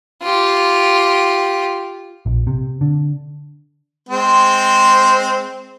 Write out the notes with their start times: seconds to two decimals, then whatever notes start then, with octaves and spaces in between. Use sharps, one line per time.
0.23 F4 G4
2.26 A#1
2.47 C3
2.81 D3
4.09 G#3 C4 C5